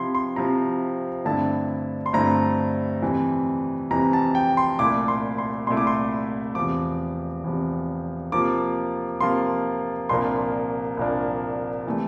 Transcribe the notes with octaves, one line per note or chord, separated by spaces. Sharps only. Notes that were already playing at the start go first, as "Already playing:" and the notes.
Already playing: C3 F3 C4 E4 C6
C6
C3 F3 C4 E4 A#5
G2 D3 A3 C4 E4 A5
C6
G2 D3 A3 C4 E4 A#5
F2 C3 E3
F2 C3 E3 A#5
A5
G5
C6
C2 A#2 A3 E4 D6
C6
C6
C2 A#2 A3 E4 C6
D6
C6
E2 C3 F3 D6
E2 C3 F3
C3 F3 A#3 F4 D6
C3 F3 A#3 F4 C6
C2 A#2 F3 A#3 D4 C6
C2 A#2 F3 A#3 D4
C3 E3 A3